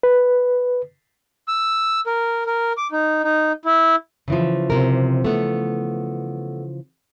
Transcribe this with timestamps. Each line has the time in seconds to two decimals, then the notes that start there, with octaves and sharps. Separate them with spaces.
0.03 B4
1.48 E6
2.07 A#4
2.47 A#4
2.77 D6
2.92 D#4
3.23 D#4
3.65 E4
4.28 C#3 E3 F3
4.70 C3 A#4
5.24 A3 B3